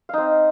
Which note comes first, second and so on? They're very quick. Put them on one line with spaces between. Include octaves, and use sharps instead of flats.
F5 D#4 C4